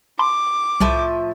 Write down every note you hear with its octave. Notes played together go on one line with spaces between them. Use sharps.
A5 B5 C6 D6
C2 A2 F3 E5